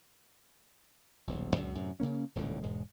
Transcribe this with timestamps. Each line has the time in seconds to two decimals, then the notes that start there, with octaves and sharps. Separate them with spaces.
1.27 D#1 B1
1.56 C#2 F#2 A#2 D3
1.75 F#2 A2 C3
2.00 C#3 F3 A#3 C#4
2.35 D#1 C#2 A2 D3
2.63 E1 G#2 G#3